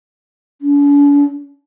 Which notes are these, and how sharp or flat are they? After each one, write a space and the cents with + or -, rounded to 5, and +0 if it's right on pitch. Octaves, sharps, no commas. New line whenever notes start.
D4 -45